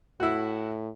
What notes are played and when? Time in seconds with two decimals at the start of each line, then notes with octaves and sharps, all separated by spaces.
0.20 A2 E4 F#4